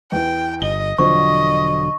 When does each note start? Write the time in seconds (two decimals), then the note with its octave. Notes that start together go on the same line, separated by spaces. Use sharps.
0.12 E2 E3 G5
0.62 G1 D#5 G7
0.98 E1 D3 F3 F#3 C4 D#5 C#6